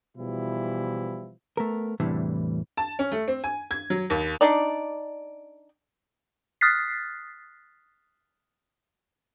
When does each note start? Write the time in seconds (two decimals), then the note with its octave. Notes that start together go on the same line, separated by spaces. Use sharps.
0.17 B2 E3 F3 G3 E4
1.57 A3 B3 A#4
2.00 E2 A2 C3 E3 G3 D4
2.77 A5
2.99 C#4
3.12 A3
3.28 C4
3.44 G#5
3.71 G#6
3.90 F#3
4.10 D#2
4.41 D4 D#4 D5
6.61 D#6 F6 F#6 A6 B6 C7